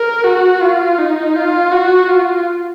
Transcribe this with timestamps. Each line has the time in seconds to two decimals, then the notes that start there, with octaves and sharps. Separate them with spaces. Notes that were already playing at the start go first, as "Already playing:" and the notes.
Already playing: A#4
0.24 F#4
0.61 F4
0.99 D#4
1.36 F4
1.72 F#4
2.09 F4